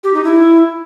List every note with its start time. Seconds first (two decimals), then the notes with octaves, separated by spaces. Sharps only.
0.04 G4
0.14 D#4
0.24 E4